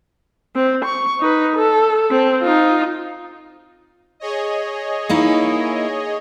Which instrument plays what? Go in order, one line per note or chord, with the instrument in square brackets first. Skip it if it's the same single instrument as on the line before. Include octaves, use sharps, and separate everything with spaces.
[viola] C4
C#6
D#4 B4
A4
C4
D#4 F4
[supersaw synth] G#4 C#5 D#5
[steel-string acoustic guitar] A#3 D#4 E4